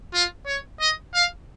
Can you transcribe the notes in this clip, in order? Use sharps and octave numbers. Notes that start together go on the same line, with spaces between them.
F4
C#5
D#5
F5